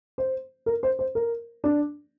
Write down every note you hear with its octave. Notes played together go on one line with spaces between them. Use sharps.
C5
A#4
C5
C5
A#4
D4